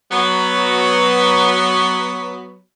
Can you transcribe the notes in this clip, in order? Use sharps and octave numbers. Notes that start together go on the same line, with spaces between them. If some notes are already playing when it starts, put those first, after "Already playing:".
F#3 B3